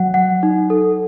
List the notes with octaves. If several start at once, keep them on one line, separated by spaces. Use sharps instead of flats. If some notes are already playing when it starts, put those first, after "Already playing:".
Already playing: F#3 F#5
F#5
D#4
A4